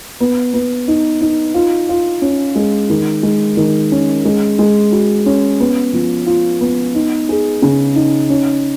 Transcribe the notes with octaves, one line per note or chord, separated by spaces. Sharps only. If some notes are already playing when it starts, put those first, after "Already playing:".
B3
B3
D#4
D#4
F4
F4
C#4
G#3
D#3
G#3
D#3
C#4
G#3
G#3
F#4
C#4
B3
F3
F4
B3
D#4
G#4
C#3
D#4
C#4